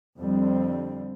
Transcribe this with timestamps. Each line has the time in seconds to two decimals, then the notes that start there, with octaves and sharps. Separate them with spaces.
0.18 F2 D3 G3 C4